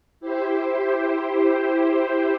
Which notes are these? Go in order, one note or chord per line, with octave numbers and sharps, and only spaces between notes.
E4 G4 C5